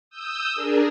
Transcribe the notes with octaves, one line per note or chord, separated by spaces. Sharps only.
D#6 E6 G6
D4 G#4 A#4